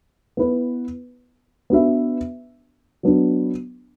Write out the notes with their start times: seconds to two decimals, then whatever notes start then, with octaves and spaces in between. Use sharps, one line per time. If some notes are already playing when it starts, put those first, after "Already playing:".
0.37 B3 E4 B4
1.70 B3 D4 F#4 B4 E5
3.03 F#3 B3 D4